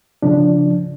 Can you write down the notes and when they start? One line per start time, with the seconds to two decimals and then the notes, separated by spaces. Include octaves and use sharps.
0.22 C#3 F3 D4